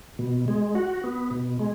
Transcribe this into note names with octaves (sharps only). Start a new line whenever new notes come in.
B2
G#3
F#4
B3
B2
G#3